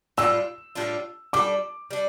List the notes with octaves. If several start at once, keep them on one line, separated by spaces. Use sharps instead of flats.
A2 G3 D4 F4 E6
A2 G3 D4 F4
G3 D4 A4 D6
G3 D4